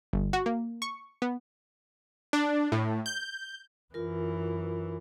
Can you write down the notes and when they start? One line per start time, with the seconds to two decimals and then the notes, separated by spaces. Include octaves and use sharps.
0.13 G1
0.33 F#4
0.46 A#3
0.82 C#6
1.22 B3
2.33 D4
2.72 A2
3.06 G6
3.94 F#2 E3 F4 A#4